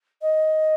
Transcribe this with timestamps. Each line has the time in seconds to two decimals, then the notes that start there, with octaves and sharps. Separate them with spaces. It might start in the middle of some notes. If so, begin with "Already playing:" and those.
0.22 D#5